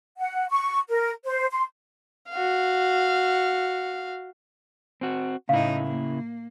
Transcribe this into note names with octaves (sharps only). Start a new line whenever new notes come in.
F#5
C#6
A#4
C5
C6
F#4 F5
C4 F#4
A2 C#3 D#4 E4 F5
A#3